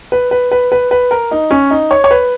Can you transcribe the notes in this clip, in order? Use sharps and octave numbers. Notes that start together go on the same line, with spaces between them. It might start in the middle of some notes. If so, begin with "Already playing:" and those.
B4
B4
B4
B4
B4
A#4
D#4
C#4
D#4
C#5
C#5
B4